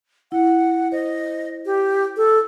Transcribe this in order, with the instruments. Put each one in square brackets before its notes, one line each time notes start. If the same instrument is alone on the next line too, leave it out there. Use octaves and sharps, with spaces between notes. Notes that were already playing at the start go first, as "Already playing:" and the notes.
[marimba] E4 [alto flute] F#5
[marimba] C5 [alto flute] D#5
[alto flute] G4
A4